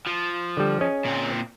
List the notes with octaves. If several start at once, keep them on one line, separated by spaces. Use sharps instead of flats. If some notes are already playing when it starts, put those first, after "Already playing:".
F3
D3 G3
C#4 G#4 D#5
A#2 C4